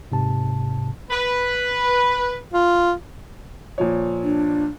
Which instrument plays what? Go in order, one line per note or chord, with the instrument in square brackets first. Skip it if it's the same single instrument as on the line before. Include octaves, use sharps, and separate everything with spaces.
[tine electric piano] G#2 C3 A5
[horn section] B4
[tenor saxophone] F4
[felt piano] A#2 F3 C#5
[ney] D4